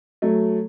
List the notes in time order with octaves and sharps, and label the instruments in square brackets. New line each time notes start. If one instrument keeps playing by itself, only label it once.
[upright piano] F#3 A3